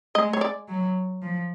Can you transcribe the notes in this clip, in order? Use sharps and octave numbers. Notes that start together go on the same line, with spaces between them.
G#3 D#5
C#5
D5
F#3
F3